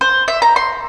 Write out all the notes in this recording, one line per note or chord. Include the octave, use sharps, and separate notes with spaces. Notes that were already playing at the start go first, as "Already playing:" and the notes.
C5
E5
A#5
C6